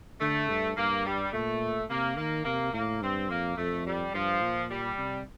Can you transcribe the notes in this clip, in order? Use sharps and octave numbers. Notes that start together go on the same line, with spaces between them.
D3 A3
G2
G2 A#3
G3
A#2 A3
C3 A#3
D#3 A#3
C3 A#3
A2 A#3
G2 C4
F2 A#3
F2 A3
G3
G2 F3
A#2
G3
C3